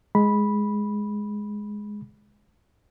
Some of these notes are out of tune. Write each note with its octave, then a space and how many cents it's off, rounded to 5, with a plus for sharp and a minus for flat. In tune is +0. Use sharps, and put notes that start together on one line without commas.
G#3 +0 B5 -10